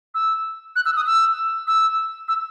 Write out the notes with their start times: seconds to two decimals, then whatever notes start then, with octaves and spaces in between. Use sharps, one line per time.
0.14 E6
0.76 F#6
0.86 E6
0.96 D#6
1.06 E6
1.67 E6
2.28 E6